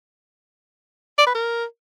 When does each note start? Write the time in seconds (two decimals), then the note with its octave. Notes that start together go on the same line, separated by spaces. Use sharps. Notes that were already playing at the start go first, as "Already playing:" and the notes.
1.18 D5
1.27 B4
1.35 A#4